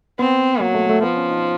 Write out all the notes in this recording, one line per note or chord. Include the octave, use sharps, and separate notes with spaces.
B3 C4
F#3 A#3
A3
A3
F3 B3
C#4
D#4